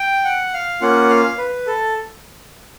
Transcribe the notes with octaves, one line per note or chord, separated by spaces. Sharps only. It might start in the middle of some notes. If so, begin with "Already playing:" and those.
Already playing: G5
F#5
F5
A#3 C#4 F4 F#5
F5
B4
A4